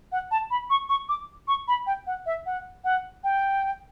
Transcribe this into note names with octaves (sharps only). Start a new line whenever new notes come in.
F#5
A5
B5
C#6
C#6
D6
C#6
B5
G5
F#5
E5
F#5
F#5
G5